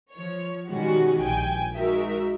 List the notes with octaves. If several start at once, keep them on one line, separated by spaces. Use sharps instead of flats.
F3 C#5
B2 D#3 G3 G#3 C#4 F#4
A#1 G5 G#5
G#3 D#4 F#4 A#4 E5